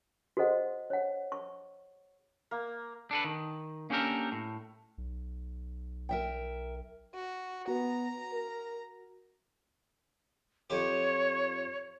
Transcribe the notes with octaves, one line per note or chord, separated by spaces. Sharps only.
F#4 G#4 A4 C5 D#5 F#5
C#5 F#5
C#6
A#3
D4 A4 B4
D#3
A#3 C#4 D4 G4 A4 A#4
A2
B1
A#4 E5 G5
F#4
B3 F#4 A#5
A#4
F2 G4 C#5